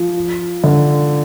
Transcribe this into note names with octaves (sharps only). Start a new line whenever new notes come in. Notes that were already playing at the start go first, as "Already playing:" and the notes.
Already playing: F3
D3